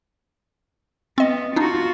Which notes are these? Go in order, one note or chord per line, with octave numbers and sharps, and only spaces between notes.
B3 C4 D#5
D4 D#4 F4 F#4